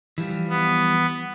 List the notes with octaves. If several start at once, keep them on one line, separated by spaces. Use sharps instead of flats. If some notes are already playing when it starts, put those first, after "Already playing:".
E3 F3 G3
B3